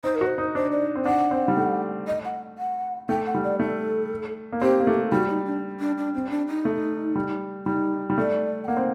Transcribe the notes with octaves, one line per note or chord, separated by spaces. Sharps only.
D#4 C5
A#4
F#4 C5
D#4
D4 C5
D5
C4
D4 F#5
C4
G3
A3
D#5
F#5
F#5
A3 G5
F#5
G3
D5
A3 A4
A#3
C4 G4
A#3
A3
G3 F#4
D#4
D4
D4
D4
C4
D4
D#4
A3
G3
G3 D#4
G3
A3 D5
G5
A#3 F#5
C4